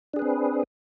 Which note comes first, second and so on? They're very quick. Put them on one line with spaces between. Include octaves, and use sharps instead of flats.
D4 G#4 B4 C4